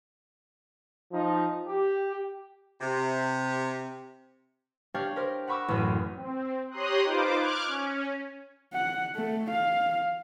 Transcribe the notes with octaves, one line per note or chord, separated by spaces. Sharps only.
F3 D#4
G4
C3
D4 G4 C#5 F5 G5
G4 A#4 C5
F#5 A#5 B5 C#6 D6 E6
A1 F#2
C4
G4 C#5 A#5 C6 D#6 F#6
D#4 F4 B4 C5 D6
D6 F6 F#6 G#6
C#4
F#5
A3
F5